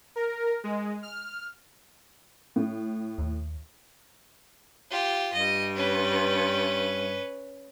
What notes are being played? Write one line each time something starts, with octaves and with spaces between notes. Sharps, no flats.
A#4
G#3
F6
A2
D#2
F4 G4
G2 D#5
C#4 B4